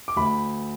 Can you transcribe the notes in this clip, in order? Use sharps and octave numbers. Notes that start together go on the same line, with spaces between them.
D6
D2 B5